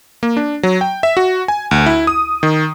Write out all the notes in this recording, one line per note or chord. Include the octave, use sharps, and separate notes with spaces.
A#3
D4
F#3
G5
E5
F#4
G#5
D2
E4
D#6
D#3